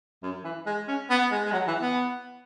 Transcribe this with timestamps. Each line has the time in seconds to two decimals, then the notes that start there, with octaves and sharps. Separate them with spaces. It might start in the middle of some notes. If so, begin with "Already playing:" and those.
0.23 F#2
0.44 E3
0.66 G#3
0.88 C#4
1.10 B3
1.31 G#3
1.45 G#3
1.52 F#3
1.67 E3
1.81 B3